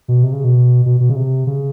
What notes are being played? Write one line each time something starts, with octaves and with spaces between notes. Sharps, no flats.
B2
C3
C#3
B2
B2
B2
C#3
C3
C#3